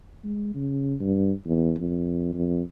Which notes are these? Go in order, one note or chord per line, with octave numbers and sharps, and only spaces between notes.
G#3
C#3
G2
E2
F2
F2